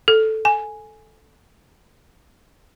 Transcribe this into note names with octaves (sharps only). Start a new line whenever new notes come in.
A4
G#5